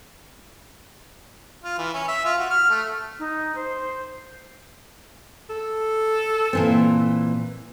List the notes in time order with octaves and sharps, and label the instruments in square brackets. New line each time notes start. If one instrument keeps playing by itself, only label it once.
[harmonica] F4
E3
C#4
E5
F4
F#4
F6
A3
[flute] D#4
C5
[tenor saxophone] A4
[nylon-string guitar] A#2 E3 C4